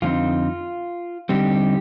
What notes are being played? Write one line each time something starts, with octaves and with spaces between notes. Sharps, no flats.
F2 D3 G#3 C4 D#4 F4
D3 G3 C4 D#4 G4